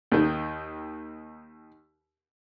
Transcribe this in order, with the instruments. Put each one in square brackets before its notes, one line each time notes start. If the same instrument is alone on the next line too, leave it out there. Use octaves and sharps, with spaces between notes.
[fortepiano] D#2 D#3